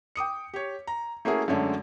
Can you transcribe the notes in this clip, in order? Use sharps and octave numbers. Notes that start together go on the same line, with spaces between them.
G5 D6 D#6 C#7
G4 C#5
A#5
A3 A#3 C#4 E4 F#4 G#4
F#2 D3 G#3 A3 C#4 D4